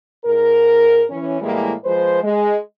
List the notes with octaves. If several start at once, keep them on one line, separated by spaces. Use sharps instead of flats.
G#2 A#4
E3 C#4
A2 E3 G3 G#3 A#3
F3 G#3 B4 C5
G#3